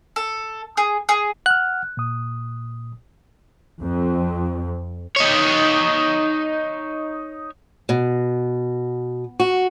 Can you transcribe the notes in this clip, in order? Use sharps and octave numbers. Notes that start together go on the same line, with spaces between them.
A4
G#4
G#4
F#5 F6 F#6
A#2 D#6
F2
D#4 C#5
B2
F#4